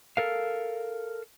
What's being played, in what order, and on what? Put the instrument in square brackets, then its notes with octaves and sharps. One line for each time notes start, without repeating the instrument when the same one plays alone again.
[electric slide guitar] A4 A#4 F5